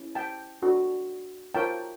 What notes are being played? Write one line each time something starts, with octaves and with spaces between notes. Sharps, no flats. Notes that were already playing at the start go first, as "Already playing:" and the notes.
Already playing: C#4 E4
G5 A5
D4 F#4 A4
F4 A#4 C#5 G5 A5